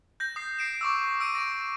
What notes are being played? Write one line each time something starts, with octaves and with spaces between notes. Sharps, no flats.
G6 A#6
D#6 C7
C7 D7 E7
C#6 D6 E6
E6 D7 D#7
C#6 A#6